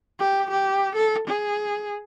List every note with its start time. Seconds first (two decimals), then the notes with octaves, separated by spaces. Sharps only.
0.19 G4
0.51 G4
0.96 A4
1.28 G#4